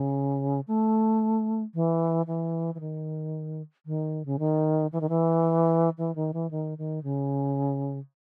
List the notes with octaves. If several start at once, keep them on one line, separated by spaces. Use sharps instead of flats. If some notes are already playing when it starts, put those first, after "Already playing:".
Already playing: C#3
A3
E3
E3
E3
D#3
D#3
C#3
D#3
E3
D#3
E3
E3
D#3
E3
D#3
D#3
C#3